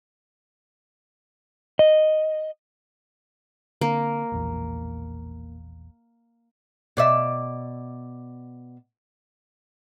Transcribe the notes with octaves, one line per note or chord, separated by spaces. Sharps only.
D#5
D3 A#3 C4
E1 A#1 E2
B2 D5 E5